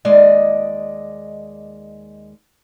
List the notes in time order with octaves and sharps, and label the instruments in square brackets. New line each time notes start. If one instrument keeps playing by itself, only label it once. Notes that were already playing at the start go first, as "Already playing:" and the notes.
[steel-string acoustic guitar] D#2 G#3 D5 D#5